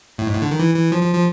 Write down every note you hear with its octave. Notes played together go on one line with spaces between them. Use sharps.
A2
G#2
A2
D3
D#3
E3
E3
F3
F3
F3